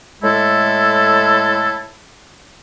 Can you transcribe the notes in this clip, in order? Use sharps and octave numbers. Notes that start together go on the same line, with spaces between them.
A2 G#3 E4 A4